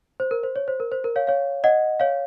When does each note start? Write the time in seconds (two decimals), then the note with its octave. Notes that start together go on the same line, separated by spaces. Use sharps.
0.20 C5
0.31 A#4
0.43 C5
0.56 C#5
0.68 C5
0.80 A#4
0.92 C5
1.04 A#4
1.16 C#5 F5
1.27 C#5 F5
1.64 D#5 F#5
2.00 C#5 F5